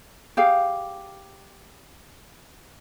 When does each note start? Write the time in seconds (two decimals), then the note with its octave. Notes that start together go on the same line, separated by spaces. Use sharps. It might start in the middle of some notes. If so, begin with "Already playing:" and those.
0.37 G4 G#4 F5